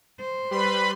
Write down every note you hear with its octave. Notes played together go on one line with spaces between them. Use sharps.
C5
G3 B4 B5 C6